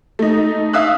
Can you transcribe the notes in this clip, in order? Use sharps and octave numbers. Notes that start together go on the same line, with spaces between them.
A3 D#4
E5 F5 D#6 E6 F#6